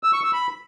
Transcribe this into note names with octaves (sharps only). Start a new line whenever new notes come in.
E6
C#6
E6
B5